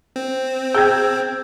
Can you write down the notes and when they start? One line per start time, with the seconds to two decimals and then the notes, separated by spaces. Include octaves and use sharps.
0.16 C4
0.74 G#4 G5 E6 G6 G#6